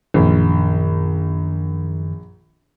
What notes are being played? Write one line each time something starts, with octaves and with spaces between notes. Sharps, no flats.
A#1 F#2 D#3